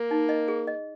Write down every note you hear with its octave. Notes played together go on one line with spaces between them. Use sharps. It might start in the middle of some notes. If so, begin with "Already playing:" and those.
Already playing: A#3
D#4
D#5
G#4
D#5